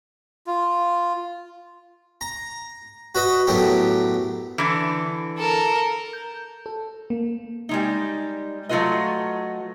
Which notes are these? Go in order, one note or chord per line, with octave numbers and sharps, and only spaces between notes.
F4
A#5
F#4 B4 D#5
F#2 A2 B3 G4
D3 E3
A4 A#4
G6
A4
A#3
G3 G#3 D#4
F#3 A3 D#4 F4 B4 D#5